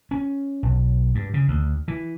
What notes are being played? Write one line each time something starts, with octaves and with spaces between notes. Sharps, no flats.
C#4
B1
G2
C#3
D2
E3